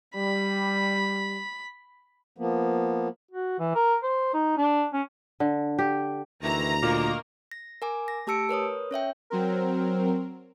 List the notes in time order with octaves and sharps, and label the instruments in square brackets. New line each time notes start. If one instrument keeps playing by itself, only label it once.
[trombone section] G3 [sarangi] B5
[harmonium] F3 A#3 B3
[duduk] F#4
E3
A#4
C5
D#4
D4
C#4
[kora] D3
G4
[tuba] D2 [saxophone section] D#3 E3 [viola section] A#5
[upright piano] A#2 [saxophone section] D#3 A#3
[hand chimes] A#6
A#4 G#5 D6
A#6
A3 G4 A5 E6 C#7 D7
A#4 B4 C#5 D#6
C#4 C#5 E5 G5
[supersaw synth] F#3 C4 A#4